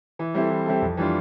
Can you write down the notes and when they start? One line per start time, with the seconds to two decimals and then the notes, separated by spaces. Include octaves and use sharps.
0.19 E3
0.34 G3 C4 E4 A4
0.50 E3
0.66 G3 C4 E4 A4
0.82 F2
0.97 E3 G3 D4 F4